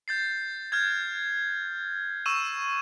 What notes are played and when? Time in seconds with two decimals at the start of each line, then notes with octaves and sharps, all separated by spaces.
0.08 G6 A6 C7
0.72 F6 G6 G#6
2.26 C#6 E6 D#7 E7